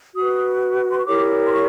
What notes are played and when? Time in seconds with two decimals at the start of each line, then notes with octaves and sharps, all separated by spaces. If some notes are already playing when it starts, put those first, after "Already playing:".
0.15 F#4 B4 D#6
0.91 C6
0.98 C#6
1.06 E4 G4 A#4 C#5 D6
1.46 C6
1.52 C#6